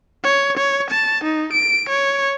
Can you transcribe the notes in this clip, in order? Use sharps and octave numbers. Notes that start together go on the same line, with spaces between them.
C#5
C#5
A5
D#4
D7
C#5